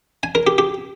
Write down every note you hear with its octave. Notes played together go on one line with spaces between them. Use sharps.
G#5
A#4
G4
G4